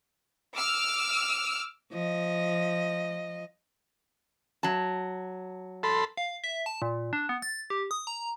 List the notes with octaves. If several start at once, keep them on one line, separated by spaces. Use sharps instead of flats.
D6 E6 F6
F3 D#5
F#3 A5
A4 B5 C6
F5
E5
A5
A#2
D4
B3
A6
G4
D#6
A#5